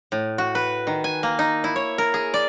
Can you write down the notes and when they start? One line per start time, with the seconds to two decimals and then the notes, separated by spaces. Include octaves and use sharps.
0.12 A2
0.38 F#4
0.55 B4
0.87 D#3
1.04 G#5
1.23 A#3
1.39 D#4
1.64 E4
1.76 C#5
1.98 A#4
2.14 G#4
2.34 D5